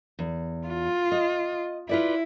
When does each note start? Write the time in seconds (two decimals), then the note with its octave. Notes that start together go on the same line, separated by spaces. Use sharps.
0.19 E2
0.68 F4
1.12 D#5
1.89 E4 F4 B4 D5